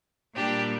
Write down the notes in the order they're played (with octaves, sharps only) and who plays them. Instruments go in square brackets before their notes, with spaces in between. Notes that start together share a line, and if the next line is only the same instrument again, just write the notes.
[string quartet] A#2 G3 D4 G4